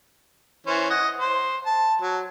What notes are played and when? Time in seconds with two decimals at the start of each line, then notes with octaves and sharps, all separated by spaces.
0.67 E3 C#4 C5
0.90 D#5 F#5
1.20 C5
1.66 A5
2.01 F#3